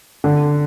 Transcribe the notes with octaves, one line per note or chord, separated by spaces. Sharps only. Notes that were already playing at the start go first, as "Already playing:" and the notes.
D3